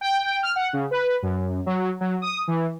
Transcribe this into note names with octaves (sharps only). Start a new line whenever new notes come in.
G5
F6
F#5
C#3
B4
F#2
F#3
F#3
D#6
E3